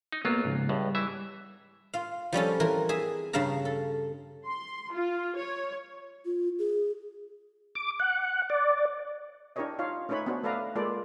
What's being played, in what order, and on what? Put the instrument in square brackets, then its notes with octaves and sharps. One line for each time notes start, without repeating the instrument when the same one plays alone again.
[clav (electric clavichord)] D#4
[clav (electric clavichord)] B1 F#3 F4 [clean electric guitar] A#3 B3
[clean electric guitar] G#2 C#3
[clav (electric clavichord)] C#2 A2 [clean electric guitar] G3
[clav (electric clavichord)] E3 E5
[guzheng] F4 F5
F3 G3 C#4 A4
E3 C4 A#4
G#4 E5
G2 C#3 F5 A5 A#5
A4
[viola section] C6
F4
C#5
[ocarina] F4
G#4
[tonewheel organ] D6
F#5
D5
[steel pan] D4 E4 G4 A#4 C#5 D#5
D#4 F4 C#5 F5
A3 C#4 D#4 B4 C#5 B5
B3 C#4 D4 F#4 C5
A3 A4 B4 D5 F5 A#5
G#3 A#3 F4 A4 B4 D5